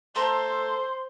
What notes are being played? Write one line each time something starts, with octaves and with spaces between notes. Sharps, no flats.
A3 A4 C5 A#5 C6